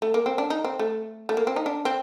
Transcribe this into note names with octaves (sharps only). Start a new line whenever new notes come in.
A3
A#3
C4
D4
D#4
C4
A3
A3
A#3
C4
D#4
D4
C4